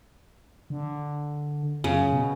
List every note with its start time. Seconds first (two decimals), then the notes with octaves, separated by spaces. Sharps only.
0.70 D3
1.84 F#2 C#3
2.12 B2